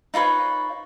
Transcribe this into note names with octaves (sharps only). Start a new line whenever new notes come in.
D#4 F4 B4 C#5